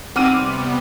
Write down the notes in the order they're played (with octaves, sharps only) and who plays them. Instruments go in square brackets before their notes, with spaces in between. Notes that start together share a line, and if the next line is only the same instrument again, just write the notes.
[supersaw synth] C3 G3 B3 [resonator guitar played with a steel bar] C4 [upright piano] F#5 [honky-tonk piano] D6 F6 D#7